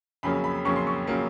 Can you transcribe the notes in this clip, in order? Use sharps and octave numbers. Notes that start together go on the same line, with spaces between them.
F2 C#3 F#3 A#3 B5
B5
F2 C#3 F#3 A#3 C#6
C6
C#6
C#3 F#3 A#3